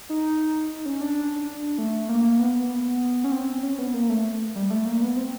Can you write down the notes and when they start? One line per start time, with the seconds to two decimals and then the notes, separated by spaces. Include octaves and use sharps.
0.09 D#4
0.86 C#4
1.01 D4
1.78 A3
2.09 A#3
2.39 B3
2.55 B3
3.24 C#4
3.32 C4
3.63 C#4
3.79 B3
3.94 A#3
4.09 A3
4.56 G3
4.70 A3
4.86 A#3
5.02 B3
5.17 C4